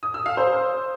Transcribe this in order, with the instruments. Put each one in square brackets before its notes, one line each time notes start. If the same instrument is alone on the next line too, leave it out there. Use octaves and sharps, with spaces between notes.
[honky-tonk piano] D#6
E6
F5
C5